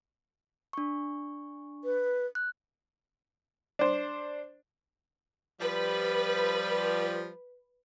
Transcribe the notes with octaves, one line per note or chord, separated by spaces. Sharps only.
D4 C#6
B4
F#6
D4 C5
F3 G3 B4